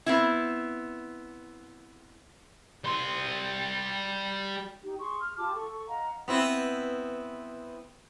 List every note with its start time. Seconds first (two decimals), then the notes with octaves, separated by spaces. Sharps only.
0.06 B3 C4 E4
2.84 G3 C6
4.83 D#4 G4
4.99 G#4 C6 C#6
5.21 F6
5.37 F4 G4 A5 D6
5.55 A4 C#6
5.88 D#5 F5 F#5 A#5
6.28 B3 C4 E4